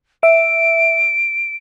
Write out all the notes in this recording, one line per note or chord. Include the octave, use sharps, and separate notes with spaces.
E5 D7